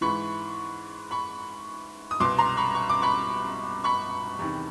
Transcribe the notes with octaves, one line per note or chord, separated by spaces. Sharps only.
G#2 E3 B5 C#6
B5 C#6
D#6
C2 B2 C6 D6
A#5 C6
B5 C#6
C#6
D6
B5 C#6
B5 C#6
E2 C3 D#3